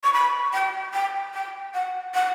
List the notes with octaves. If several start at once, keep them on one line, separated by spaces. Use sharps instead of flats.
C#6
B5
G5
G5
G5
F#5
F#5